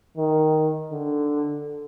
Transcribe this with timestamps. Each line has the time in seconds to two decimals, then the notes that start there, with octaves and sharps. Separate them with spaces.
0.17 D#3
0.92 D3